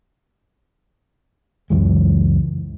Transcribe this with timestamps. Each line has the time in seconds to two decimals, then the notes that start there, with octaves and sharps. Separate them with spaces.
1.70 C#2 F#2 E3 G#3